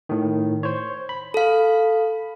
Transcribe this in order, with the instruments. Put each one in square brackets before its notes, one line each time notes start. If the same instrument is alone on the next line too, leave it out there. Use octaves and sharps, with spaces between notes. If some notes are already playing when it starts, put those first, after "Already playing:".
[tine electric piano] A2 D#3
C5 C#5
B5
[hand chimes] A4 F5